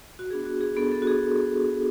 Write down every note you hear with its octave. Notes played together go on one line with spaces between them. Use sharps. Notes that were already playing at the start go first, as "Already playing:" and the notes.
F#4
B3 D4 F#4 G#4
F#4
G#4
B3 D4 F#4 A4
A4
F#4
G#4